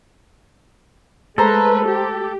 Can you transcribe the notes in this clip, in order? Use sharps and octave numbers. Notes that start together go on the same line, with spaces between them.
G#3 A3 A4 B4 C5 A#5
G4